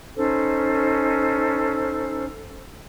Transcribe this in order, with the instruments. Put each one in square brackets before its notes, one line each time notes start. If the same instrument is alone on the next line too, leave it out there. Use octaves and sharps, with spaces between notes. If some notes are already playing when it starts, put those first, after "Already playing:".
[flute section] C#4 D#4 A4 C5